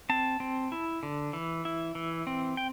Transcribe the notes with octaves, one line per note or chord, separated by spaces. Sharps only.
C4 A5
C4
E4
D3
E3
E4
E3
C4
G5